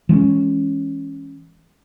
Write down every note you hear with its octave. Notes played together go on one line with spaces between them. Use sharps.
E3 G#3 B3 C#4